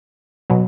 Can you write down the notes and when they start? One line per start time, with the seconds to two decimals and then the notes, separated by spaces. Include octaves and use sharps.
0.50 B2 F#3